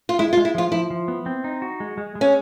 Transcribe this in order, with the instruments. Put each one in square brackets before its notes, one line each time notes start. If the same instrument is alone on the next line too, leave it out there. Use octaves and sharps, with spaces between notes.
[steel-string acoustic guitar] F4
[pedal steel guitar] G#3 [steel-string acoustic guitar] E4
[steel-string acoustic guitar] F4
[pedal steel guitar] G#3
[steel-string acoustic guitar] E4
[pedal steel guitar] F3 [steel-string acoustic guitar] F4
[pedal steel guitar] F3 [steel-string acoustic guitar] E4
[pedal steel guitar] F3
B3
C4
D#4
F#4
G#3
G#3
G#3
[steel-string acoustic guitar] C#4